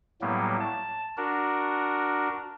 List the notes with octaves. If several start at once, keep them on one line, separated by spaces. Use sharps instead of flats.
A2 F#3 G3 A#3 B3
A5
D4 F#4 A#4